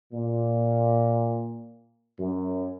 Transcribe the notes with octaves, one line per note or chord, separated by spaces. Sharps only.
A#2
F#2